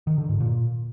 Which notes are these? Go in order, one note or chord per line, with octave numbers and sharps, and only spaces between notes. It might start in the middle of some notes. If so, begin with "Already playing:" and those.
D#3
D3
G#2
A#2